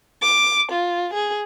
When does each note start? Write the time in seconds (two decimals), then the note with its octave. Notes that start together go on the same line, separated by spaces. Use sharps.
0.22 D6
0.71 F4
1.13 G#4